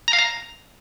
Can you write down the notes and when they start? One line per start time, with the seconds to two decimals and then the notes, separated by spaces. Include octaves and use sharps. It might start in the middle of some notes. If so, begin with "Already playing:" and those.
0.08 A#5
0.13 F5
0.18 A#5